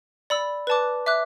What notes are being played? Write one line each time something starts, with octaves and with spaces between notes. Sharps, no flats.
D5 B5 E6
B4 D5 A5 D6 F#6
E5 D6 F#6